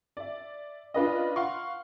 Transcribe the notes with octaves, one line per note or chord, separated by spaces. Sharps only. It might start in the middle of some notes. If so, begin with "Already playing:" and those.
D5 E5
D4 F4 B4 D#5
F5 F#5 C6 C#6